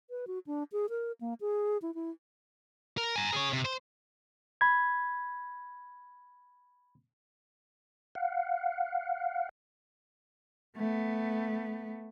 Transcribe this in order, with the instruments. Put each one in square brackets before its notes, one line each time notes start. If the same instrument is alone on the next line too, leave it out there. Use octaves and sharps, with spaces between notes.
[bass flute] B4
F#4
D4
G#4
A#4
A#3
G#4
E4
E4
[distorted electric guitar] A#4
G#5 A#5
G#4 C#5
C3
C5
[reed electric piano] B5 G#6
[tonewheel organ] F5 F#5
[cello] A3 B3